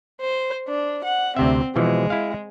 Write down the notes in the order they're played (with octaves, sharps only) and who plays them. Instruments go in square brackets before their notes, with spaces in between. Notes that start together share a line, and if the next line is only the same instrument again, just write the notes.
[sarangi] C5
D4
F#5
[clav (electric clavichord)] D2 C3 E5 [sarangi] C4
[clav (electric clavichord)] B2 E3 F3 [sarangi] G#3
[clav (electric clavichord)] E4 F5